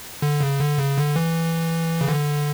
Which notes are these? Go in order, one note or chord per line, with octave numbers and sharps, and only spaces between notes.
D3
C#3
D3
C#3
D3
E3
C#3
D3